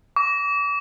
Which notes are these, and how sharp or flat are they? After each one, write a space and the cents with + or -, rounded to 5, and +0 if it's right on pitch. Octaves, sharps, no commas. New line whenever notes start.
D6 -40